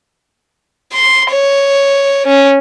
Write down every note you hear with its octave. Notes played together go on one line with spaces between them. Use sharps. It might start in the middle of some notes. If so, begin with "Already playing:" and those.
C6
C#5
C#4